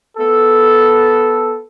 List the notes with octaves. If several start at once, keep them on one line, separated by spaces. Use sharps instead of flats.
B3 A4